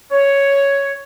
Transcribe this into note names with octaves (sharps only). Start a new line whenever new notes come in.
C#5